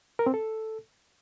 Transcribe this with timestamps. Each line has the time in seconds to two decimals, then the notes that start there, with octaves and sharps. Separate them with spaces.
0.19 A#4
0.26 C4
0.34 A4